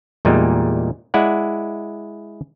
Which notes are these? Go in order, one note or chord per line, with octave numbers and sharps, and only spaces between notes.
E2 A#2 G3 G#3 D#4
G#3 E4 D5 F#5